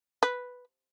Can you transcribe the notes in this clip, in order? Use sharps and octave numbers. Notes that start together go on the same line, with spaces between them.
B4